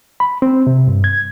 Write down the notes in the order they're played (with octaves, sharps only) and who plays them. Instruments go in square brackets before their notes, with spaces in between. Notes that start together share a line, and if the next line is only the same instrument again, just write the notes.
[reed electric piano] B5
C4
C3
G2
G#6